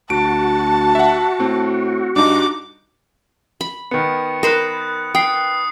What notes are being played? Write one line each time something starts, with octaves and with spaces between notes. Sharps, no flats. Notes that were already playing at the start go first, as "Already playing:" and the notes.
D2 F#4 A5 D7
E5 F#5
A2 C4
G2 D4 D#4 D6
B5
D#3 B3 C#7
A#4 C5 B5 D#6 F#6
G5 D#6 C7